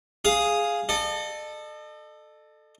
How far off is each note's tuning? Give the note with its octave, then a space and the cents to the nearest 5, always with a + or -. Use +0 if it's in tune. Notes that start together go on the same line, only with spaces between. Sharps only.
G#4 +0 F5 +0 D#6 +0
A4 +0 D#5 -45